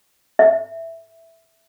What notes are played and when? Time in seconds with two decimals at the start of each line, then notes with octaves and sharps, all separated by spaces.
0.39 E5